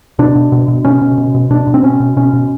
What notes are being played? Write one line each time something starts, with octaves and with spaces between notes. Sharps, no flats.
B2 D4
B2
B2
B2
B2 C#4
B2
B2
B2
B2 D4
B2
C4
B2 C#4
B2
B2 C#4
B2